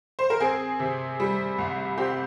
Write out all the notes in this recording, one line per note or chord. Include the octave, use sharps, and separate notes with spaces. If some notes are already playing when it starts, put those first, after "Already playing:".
C5
A#4
C4 G#4
C3
G3
C2
C4 G4